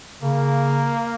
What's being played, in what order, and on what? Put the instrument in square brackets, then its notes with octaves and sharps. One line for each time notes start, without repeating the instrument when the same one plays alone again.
[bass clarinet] C#3 [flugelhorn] A#3